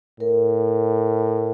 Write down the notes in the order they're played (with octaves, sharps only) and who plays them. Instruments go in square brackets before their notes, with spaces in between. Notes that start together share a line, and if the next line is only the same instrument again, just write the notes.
[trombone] A2 [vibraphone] A#4